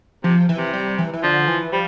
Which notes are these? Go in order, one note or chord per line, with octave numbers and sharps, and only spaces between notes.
C3 F3
E3
C3
G3
E3
E3
D3 F3
E3
F3 G3